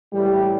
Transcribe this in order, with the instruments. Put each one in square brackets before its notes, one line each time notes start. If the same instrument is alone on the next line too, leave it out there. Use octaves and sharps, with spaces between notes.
[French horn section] A2 E3 G3